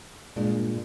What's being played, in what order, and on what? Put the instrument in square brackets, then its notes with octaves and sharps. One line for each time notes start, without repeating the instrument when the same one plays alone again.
[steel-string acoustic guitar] G2 G#3 D4 [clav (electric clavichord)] A#2